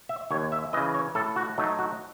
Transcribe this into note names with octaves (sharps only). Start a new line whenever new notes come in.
E5
D#2 C#5
E5
C#3 E3 D#5
C#5
A2 A4
F#4
F#3 A3 D#4
F#4